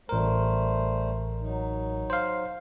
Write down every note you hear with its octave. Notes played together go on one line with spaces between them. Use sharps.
A1 G3 A3 A#4 C5
F#3 D#4
C5 F5